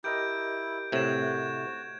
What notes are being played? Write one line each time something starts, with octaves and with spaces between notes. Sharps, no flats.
E4 G4 A#4 D#5 G6 D7
A2 C3 F#4 G#6 E7